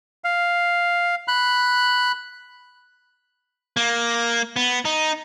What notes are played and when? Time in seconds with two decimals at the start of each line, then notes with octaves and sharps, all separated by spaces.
0.24 F5
1.28 B5 F#6
3.77 A#3
4.56 B3
4.85 D#4